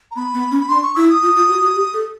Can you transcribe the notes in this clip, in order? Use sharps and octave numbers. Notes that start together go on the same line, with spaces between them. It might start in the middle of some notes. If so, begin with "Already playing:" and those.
A#5
B3 B5
B3
C#4
B5
D4 C6
C#6
E4 E6
D#6
F4
F4
F#4
F#4
G4
A4